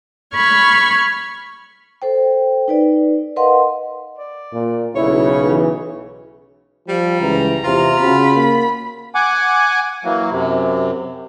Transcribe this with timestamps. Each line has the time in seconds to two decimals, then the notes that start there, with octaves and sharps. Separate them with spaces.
0.34 B5 C#6 F6 G#6
2.02 A4 C5 G5
2.68 D#4 B4 D5
3.36 A#4 B4 D#5 F5 F#5 C6
4.18 D5
4.53 A#2
4.95 B1 C#3 E4 C#5
5.49 E3
6.88 F3 G3
7.21 C#2 E3 A#5
7.64 E2 C3 F4
8.00 C#3 F#4 B5
8.35 A#3
9.15 F#5 G#5 D6
10.05 E3 F#3 A#3
10.31 F#2 C3